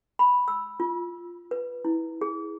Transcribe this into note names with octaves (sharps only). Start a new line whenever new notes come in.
B5
E6
F4
B4
E4
G#4